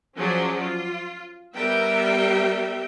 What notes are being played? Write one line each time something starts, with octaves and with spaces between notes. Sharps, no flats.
F3 F#3 C#4 G#4 D5
F4
G3 B3 A#4 E5 G5